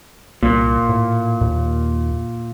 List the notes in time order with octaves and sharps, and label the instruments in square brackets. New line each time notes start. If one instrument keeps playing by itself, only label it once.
[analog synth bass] C2 [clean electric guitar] A#2
[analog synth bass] A2
D#2